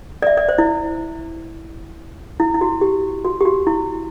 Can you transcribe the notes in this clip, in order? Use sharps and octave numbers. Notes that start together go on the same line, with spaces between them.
D5
E5
D5
C5
E4
E4
E4
F#4
G4
F#4
G4
F#4
E4